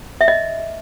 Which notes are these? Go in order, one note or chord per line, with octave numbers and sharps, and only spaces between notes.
E5
D#5